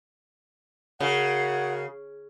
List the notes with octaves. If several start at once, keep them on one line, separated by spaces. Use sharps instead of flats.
C#3 F#4 A#4 F#5